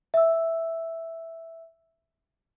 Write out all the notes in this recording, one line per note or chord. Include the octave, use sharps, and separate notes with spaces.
E5 E6